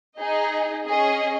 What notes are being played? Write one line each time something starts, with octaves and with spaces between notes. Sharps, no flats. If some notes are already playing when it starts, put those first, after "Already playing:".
D#4 G#4 D#5
C#4 G#4 D#5